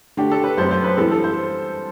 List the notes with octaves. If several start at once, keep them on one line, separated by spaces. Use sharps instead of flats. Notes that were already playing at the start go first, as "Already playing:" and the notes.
D3 A3 D4 G4
A4
B4
F#2 F#3 C4 C5
C5
B4
G2 E3 G3 C4 E4 A4
A4
C5